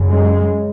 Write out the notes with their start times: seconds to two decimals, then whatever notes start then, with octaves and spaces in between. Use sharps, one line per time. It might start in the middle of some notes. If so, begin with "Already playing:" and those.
Already playing: F#2 C#3
0.10 G#3